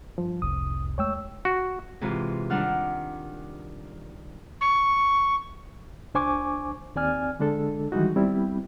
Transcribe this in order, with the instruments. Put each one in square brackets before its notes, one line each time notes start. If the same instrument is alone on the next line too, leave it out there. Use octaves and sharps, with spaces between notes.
[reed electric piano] G2 F3
[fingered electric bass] F1 C2 [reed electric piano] D#6
[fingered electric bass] E2 G#3 A3 [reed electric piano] C#5 G5 E6
[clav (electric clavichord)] F#4
[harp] G#2 C3 E3 F4
D#3 G3 D4 F#5 F6
[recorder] C#6
[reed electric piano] C#2 D4 C5 G#5 C#6 D6
D#2 C4 D5 G#5 F6
D3 G#3 D4 A4
D#3 E3 G3 G#3 D#4 F#4
G3 B3 C4 E4